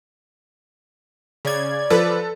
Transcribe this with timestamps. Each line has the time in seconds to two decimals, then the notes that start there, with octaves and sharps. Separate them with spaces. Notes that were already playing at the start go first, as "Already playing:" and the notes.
1.45 C#3 D5 G#6
1.90 F3 A4 B4